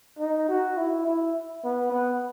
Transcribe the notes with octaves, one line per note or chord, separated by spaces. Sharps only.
D#4
F#4
E4
E4
B3
B3